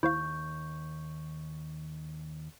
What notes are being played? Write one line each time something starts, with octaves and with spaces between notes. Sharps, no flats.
D#2 E4 C5 F5 C#6 G6